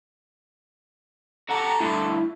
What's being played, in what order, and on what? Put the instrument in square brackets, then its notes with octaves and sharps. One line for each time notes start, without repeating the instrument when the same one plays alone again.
[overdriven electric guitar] F#4 G4 [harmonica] A4 [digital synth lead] A#5
[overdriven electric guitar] D2 G2 [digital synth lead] E4